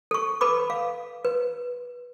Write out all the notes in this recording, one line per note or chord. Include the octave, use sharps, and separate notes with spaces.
A4 C#6
A4 B4 B5 D6
F5
B4